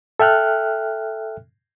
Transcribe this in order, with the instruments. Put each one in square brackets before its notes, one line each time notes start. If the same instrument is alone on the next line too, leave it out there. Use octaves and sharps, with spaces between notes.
[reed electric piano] A4 E5 G5 F6 F#6